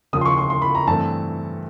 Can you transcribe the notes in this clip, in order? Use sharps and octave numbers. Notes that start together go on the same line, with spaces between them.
D#2 C#3 F3 D#6
C6
C#6
C6
C6
B5
A#5
G2 E3 A3 C4 A5